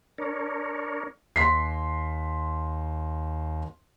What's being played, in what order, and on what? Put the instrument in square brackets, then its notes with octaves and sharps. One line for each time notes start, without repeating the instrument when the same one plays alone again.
[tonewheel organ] D4 A#4 C#5
[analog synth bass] D#2 [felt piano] C6 B6 C7